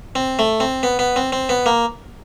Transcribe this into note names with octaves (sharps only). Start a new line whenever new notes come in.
C4
A3
C4
B3
B3
C4
C4
B3
A#3